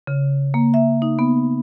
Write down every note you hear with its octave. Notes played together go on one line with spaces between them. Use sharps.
C#3
A#3
E5
D#4
B3